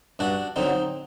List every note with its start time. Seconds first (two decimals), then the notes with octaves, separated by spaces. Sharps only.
0.19 G2 D4 F#4
0.56 D3 F#3 C4 D#4